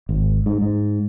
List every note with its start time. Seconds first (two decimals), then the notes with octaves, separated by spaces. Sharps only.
0.09 G#1
0.46 G#2
0.62 G#2